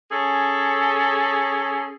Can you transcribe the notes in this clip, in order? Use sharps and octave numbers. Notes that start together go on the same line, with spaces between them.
C#4 G#4 A4